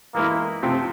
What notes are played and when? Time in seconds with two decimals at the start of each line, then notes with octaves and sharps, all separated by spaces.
0.14 E3 G#3 A#3 B3 E4
0.62 C3 F3 A3 C4